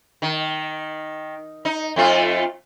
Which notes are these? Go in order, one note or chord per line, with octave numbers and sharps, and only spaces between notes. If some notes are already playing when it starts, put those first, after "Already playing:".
D#3
D#4
F2 A3 F4